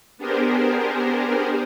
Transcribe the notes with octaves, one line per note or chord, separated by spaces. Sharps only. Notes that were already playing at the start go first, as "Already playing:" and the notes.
B3 D4 G4 G#4 A#4 C5